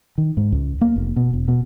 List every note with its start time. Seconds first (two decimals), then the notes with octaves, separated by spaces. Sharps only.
0.18 D#3
0.37 G#2
0.52 C#2
0.81 A#3
0.96 F1
1.16 B2
1.33 E1
1.48 B2